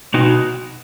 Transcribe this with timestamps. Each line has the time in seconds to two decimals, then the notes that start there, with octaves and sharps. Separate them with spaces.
0.14 B2 D#4 F#4